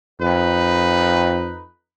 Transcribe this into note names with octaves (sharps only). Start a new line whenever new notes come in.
F2 D#4 B4